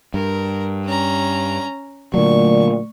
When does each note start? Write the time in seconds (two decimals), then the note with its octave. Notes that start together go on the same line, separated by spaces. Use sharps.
0.14 G2 A#4
0.85 C#4 A#5
2.14 A#2 D3 F#3 A3 D5 C#6